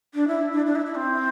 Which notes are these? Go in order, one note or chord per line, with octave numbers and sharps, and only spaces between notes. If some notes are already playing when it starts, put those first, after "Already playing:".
D4
E4
D4
D4
E4
E4
C4